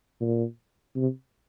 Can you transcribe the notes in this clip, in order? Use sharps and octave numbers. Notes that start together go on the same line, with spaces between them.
A#2
C3